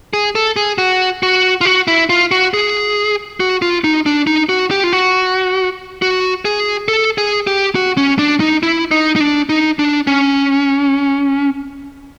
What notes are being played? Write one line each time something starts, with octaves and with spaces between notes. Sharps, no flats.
G#4
A4
G#4
F#4
F#4
F4
F#4
E4
F4
F#4
G#4
F#4
F4
D#4
D4
D#4
F#4
G4
F4
F#4
F#4
G#4
A4
G#4
G4
F#4
C#4
D4
D#4
E4
D#4
D#4
D4
D#4
D4
C#4